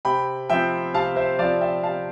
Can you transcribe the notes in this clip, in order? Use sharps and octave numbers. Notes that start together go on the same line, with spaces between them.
C3 G5 B5
F3 C4 E5 G5
C3 F5 A5
C5 E5
F3 C4 D5 F5
E5 G5
C3 F5 A5